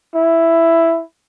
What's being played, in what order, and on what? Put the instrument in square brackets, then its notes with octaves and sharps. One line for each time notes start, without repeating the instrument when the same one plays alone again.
[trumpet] E4